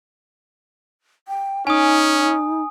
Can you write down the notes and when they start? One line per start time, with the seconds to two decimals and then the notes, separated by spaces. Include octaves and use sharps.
1.28 G5
1.67 C#4 D#4 G#5 D#6